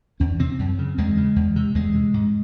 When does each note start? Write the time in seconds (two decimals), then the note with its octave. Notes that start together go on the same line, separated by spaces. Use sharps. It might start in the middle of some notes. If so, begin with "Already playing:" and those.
0.20 E2 C#4
0.39 C3 C4
0.59 F#2
0.79 C#3
0.98 E2 G#3
1.17 C#3
1.36 E2
1.56 C3
1.75 E2 G#3
1.95 C3
2.14 G#2